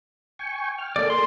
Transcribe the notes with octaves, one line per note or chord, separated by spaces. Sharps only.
G5 G#5 C#6
G5 F6
A#3 G#4 A4 D5
C6